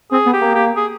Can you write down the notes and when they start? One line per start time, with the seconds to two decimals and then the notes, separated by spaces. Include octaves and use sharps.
0.12 C4 G#4
0.26 B3
0.33 G4
0.41 A#3
0.55 G4
0.76 G#4